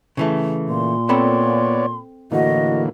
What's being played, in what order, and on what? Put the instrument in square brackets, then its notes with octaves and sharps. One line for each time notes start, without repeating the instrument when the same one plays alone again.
[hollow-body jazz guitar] C#3 E3 A3
[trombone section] A#2 [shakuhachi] C6
[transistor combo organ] B3 C#5 D5 [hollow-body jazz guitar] C4 A4 B5
[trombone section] A2 F#4 [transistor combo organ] D3 E3 A#3 [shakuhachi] D#5